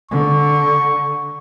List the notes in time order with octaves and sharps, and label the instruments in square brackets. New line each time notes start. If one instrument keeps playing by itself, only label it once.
[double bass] D3 [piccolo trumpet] C#6